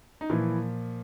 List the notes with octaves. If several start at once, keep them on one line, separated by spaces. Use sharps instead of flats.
D#4
A#2 E3 F3 E4